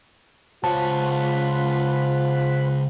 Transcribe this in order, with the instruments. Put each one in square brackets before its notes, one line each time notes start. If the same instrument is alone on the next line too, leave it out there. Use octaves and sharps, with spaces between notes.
[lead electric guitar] C#2 C#5 [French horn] F4 [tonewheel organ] C5 F#5 B5 [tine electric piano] A5